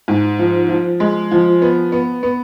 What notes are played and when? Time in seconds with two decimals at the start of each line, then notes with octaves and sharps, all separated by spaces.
0.08 G#2
0.39 F3
0.69 F3
1.00 G#3
1.31 F3
1.62 B3
1.92 B3
2.23 B3